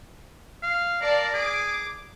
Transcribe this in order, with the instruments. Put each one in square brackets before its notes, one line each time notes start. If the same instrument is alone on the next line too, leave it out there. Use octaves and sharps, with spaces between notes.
[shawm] F5
[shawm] A#4 [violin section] D5 F5 A5
[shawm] G#4 [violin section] D6 D7